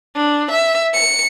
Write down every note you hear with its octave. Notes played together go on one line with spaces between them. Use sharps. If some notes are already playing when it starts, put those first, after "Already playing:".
D4
E5
C#7